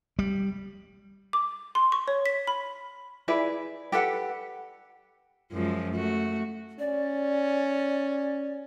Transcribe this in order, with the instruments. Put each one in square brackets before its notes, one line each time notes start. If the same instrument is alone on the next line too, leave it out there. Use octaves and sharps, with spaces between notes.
[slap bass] G3
[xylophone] D6
C6
C#6
C#5
B6
B5
[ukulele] E4 G#4 B4 D5
G4 A4 B4 F#5
[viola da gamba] F#2 F3 G#3
A3 F#4
[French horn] C#4 [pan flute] D5